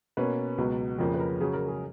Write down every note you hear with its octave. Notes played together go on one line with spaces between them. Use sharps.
B2 A#3 C#4 B4
C#2 B2 F#3
F2 C#3 F3 A#3 A#4
B4
A#4
C#3 F#3 C#4 G#4
A#4
G#4